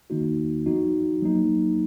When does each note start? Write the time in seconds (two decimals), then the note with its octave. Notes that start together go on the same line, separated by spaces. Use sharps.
0.10 D#3 A#3 D#4 F#4
0.66 F3 B3 D#4 F#4
1.22 F#3 A#3 D#4